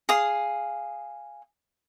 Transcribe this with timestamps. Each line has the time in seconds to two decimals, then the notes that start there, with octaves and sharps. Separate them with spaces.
0.09 G#4 F5 D#6